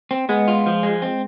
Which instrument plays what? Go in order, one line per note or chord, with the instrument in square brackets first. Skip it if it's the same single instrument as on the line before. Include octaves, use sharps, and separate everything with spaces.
[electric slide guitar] C4
[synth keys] G#3 [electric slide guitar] B3
[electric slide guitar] F4
F3
G#3
C4